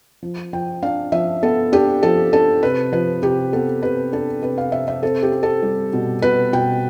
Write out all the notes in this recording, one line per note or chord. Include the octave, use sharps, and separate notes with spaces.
F3
F3 G5
D4 F5
F3 E5
B3 A4
D4 G4
F3 A4
D4 A4
C3 B4
F3 B4
C3 G4
B3 A4
C3 B4
D4 A4
C3 B4
F5
C3 E5
E5
C4 A4
G4
C4
A4
G3
B2
B2 B4
B2 G5